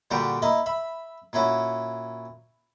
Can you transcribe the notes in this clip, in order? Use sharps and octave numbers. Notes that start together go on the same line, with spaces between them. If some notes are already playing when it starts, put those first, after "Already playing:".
A#2 D3 G3 F#4 G4
A#3 E4 D#5
E5 B5
A#2 C#4 E4 F#4